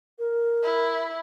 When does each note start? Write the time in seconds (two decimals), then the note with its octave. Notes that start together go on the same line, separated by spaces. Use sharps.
0.18 A#4
0.63 E4